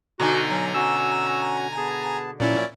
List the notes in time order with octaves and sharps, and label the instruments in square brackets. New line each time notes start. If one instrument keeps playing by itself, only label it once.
[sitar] B2 D3 D#4 [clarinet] F#4 [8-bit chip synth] G#5 A#5
[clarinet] F#3
[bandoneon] C#4 F#4 [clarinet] E6
[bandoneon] B3 A5 [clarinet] G#4
[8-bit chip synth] A#2 C#4 E4 [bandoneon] F3 F#3 [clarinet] D5